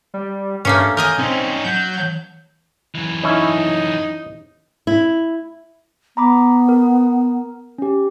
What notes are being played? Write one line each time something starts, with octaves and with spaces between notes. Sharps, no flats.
G3
G2 A3 A#3 C#4
A#4 D#5 G#5 G6
C4 C#4 D#4
F#3 G6
F#2 E3
C#4 D#4 E4
E4
B3 A#5 B5 D6
A#4
C#4 G4